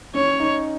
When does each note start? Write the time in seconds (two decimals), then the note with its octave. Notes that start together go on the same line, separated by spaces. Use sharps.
0.15 C#4 C#5
0.40 D#4